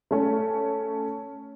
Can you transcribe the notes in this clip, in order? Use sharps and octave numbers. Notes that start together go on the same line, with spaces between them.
A3 C#4